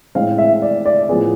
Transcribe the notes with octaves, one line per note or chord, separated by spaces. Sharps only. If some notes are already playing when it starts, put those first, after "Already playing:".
A2 G#3 C4 F5
E5
D5
D5
A2 F3 B3 G#4